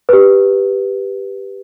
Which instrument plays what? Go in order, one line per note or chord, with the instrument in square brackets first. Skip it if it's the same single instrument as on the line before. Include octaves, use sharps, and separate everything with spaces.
[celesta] G4 B4